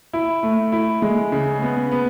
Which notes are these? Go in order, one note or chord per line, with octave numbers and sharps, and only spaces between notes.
E4
A3
E4
G#3
C#3
B3
B3